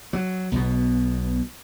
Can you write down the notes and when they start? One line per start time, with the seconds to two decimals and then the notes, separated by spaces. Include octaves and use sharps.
0.13 F#3
0.52 B1 B2